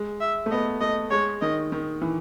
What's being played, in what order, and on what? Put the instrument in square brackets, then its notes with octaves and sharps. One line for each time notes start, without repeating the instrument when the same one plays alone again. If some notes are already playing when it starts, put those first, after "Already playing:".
Already playing: [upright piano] G#3
[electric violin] E5
[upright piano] A3
[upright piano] B3 [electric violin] D#5
[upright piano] A3 [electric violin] D#5
[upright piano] G#3 [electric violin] C#5
[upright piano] D#3 [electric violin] D#5
[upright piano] D#3
E3